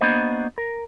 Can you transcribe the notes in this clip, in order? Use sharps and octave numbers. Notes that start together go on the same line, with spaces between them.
A#3 B3 D4 F#4 C5 D#5
A#4